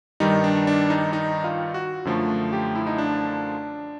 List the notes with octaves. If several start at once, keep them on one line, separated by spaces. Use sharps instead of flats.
G2 D#3 G3 D#4
D4
D4
D#4
D#4
F4
F#4
F#2 D3 F3 A3
G4
E4
D#4
D4